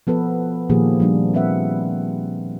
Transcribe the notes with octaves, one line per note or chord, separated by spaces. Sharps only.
F3 B3 A4 B4
A#2 D#3 F3 A#3 G4 G#4
F3 G3 D4
C4 B4 E5 F#5